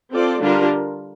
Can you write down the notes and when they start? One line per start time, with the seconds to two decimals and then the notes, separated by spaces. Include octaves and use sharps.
0.12 C4 F4 A4 D5
0.41 D3 G3 D4 F4 A#4